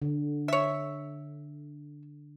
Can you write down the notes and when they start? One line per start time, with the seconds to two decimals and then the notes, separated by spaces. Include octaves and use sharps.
0.02 D3
0.48 C#5 E5